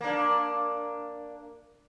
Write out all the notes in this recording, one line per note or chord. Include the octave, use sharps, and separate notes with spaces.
A#3 D4